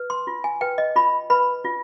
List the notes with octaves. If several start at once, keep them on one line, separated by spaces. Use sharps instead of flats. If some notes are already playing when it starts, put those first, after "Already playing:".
Already playing: B4
C6
F4
G#5
B4 G5
D#5
F4 B5
B4 B5
F4